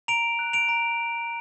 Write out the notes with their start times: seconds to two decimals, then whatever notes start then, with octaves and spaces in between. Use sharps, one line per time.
0.08 A#5 D7 F7
0.39 F#6
0.53 D7 F7
0.69 A#5